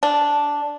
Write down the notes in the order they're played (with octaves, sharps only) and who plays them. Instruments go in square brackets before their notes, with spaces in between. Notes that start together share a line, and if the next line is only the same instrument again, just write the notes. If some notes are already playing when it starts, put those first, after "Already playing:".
[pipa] D4